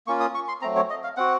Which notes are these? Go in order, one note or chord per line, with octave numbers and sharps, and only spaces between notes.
A#3 C#4 F4 C#6
D#6
C#6
C6
F#3 A3 C4 A#5
C#5
D#5
F5
C4 F#4 F#5